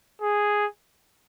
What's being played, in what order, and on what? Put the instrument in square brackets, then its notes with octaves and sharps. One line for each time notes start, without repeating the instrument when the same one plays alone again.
[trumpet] G#4